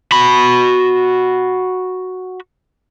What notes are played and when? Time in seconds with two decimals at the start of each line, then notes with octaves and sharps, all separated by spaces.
0.12 F#4 B5